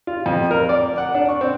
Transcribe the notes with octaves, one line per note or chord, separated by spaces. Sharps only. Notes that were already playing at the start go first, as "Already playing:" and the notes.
F4
F2
A#4
D5
F#5
D4
C#6
C4